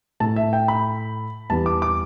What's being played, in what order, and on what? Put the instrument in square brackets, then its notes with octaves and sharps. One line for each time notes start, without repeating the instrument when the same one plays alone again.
[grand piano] A2 A3 A5
E5
G5
B5
E2 E3 G3 B3 A5
D6
D6